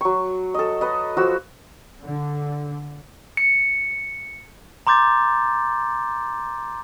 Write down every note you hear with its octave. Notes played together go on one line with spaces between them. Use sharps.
F#3 C#6
A4 D#5
B4 D#5
F3 F#4 E6
D3
C#7
A#5 C6 D6 G6 A6